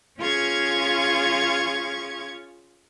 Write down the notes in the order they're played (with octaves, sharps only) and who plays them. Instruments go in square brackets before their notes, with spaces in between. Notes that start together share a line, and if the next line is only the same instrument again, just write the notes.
[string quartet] C#4 F4 G#4 C#6 G#6